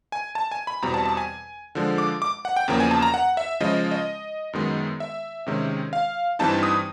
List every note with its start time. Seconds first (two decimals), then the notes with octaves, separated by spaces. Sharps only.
0.12 G#5
0.35 A5
0.51 G#5
0.67 B5
0.82 E2 B2 G3 C4 A#5
0.94 A5
1.05 A5
1.17 G#5
1.75 D3 F3 G#3
1.98 D6
2.22 D6
2.45 F#5
2.56 G5
2.68 E2 C#3 F3 A#3
2.80 G#5
2.91 A5
3.02 A#5
3.14 F#5
3.37 E5
3.60 C#3 F3 G#3 D#5
3.91 D#5
4.53 F#2 D#3 G#3 B3
5.00 E5
5.47 C3 D#3 G#3 C#4
5.93 F5
6.39 G2 E3 G3 C4 D#4 A5
6.63 D#6